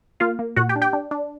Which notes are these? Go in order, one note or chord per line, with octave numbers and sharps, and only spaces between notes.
A#3 F4 F5
A#3
A#2 F#4 F#5
G4 G5
D4
G4 G5
D4
D4